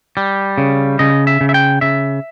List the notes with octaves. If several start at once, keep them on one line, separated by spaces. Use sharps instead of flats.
G3
C#3
C#3 D#5
E5
C#3
E5
G5
C#3 E5